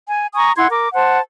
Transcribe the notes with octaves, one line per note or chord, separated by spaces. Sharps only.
G#5
G#5 A#5 C#6 D#6
E4 F#5 C6 G#6
A#4 D6
C5 F#5 A5